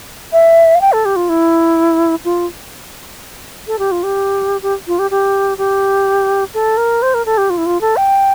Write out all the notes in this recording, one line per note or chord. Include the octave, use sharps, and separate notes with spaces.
E5
F5
G5
A4
G4
F4
E4
F4
A4
G4
F4
G4
G4
F4
G4
G4
G4
A4
A#4
C5
A#4
A4
G4
F4
E4
F4
A4
G5